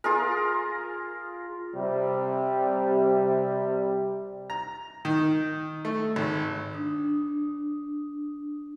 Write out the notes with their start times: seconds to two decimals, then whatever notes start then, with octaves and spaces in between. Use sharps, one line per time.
0.04 F4 G#4 A#4
1.75 C3 G3
4.50 A#5
5.05 D#3
5.85 A3
6.16 G#1
6.74 D4 D#6